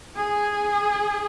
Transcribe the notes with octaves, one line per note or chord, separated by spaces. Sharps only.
G#4